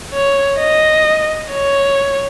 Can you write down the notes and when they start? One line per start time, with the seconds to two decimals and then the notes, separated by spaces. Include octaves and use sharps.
0.14 C#5
0.60 D#5
1.52 C#5